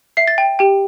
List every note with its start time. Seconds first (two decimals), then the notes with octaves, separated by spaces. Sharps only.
0.17 E5 C7
0.28 A6
0.38 G5
0.59 G4 G5